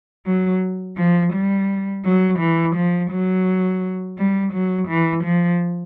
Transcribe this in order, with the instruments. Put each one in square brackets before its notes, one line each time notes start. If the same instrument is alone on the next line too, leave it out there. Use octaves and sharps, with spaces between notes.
[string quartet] F#3
F3
G3
F#3
E3
F3
F#3
G3
F#3
E3
F3